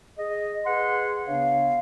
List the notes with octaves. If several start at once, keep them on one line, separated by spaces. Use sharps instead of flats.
G#4 D#5
G#4 B4 F#5 C6
C#3 B3 D4 C#5 F5